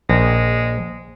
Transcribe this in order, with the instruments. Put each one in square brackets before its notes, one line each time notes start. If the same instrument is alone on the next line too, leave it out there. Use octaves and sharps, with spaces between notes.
[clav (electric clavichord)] A#1 [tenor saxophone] G#3